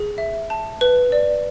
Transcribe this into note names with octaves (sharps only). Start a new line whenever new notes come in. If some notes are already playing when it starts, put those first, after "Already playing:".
Already playing: G#4
E5
A5
B4
D5